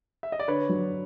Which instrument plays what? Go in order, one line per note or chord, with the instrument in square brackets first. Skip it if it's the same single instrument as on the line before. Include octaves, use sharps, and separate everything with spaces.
[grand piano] E5
D#5
D5
[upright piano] D3 [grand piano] B4 C#5
[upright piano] F#3